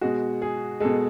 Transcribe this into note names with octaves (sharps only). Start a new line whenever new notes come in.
B2 G#3 F#4
G#4
B2 G#3 A4